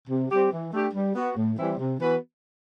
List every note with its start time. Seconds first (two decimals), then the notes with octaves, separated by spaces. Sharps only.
0.08 C3
0.30 G3 C4 G4
0.51 E3
0.72 A3 D4 G4
0.94 G3
1.15 B3 F#4
1.36 A2
1.57 E3 G3 C4 E4
1.78 C3
1.99 E3 B3 F#4 B4